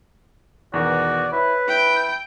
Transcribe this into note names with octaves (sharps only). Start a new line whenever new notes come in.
E2 B2 D#3 F#4 D5
E4 B4 C#5
E4 G5